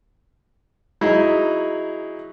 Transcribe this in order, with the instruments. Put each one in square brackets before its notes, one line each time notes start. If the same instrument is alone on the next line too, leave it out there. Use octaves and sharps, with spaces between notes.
[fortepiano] F#3 D#4 E4 G#4